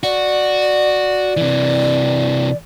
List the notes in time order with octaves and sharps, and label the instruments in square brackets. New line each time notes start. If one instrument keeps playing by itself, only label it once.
[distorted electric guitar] F#4 [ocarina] D5
[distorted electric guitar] C3 E3